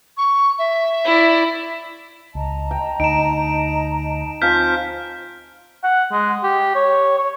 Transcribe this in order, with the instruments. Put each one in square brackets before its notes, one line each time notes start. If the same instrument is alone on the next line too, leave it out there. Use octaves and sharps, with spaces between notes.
[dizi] C#6
E5
[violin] E4 D5
[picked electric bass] C#2 [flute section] D#5 A5 A#5
[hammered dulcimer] G5
[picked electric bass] D2 [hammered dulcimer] D#4 [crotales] D7 E7
[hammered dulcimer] F3 C4 G#5 [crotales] F6 G6 B6
[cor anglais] F#5
G#3
G4
C#5
C#5